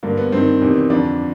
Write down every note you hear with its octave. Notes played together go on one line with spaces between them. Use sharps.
G2 D3 A#3
B3
G2 D#3 C4
E2 C3 D#3
F2 D3 D4